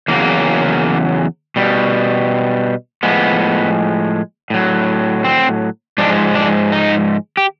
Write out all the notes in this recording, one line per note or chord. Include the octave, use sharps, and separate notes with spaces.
E2 C#3 F#3 A#3
B2 G3
A2 F3 G#3 B3
A2 F#3
C4
G#2 F3 G#3 D4
D4
D#4
G4